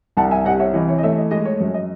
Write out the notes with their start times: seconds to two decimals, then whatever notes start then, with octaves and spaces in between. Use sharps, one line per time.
0.17 C2 F#5 A5
0.31 E5 G#5
0.45 C3 D#5 F#5
0.60 C#5 E5
0.74 E3 D#5
0.89 C#5
0.98 D#5
1.03 A3 C#5 E5
1.17 D#5
1.31 G#3 D#5
1.45 C#5
1.60 F#2 C#5
1.74 D#5